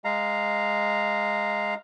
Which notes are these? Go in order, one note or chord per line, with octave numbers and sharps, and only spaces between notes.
G#3 F5 A#5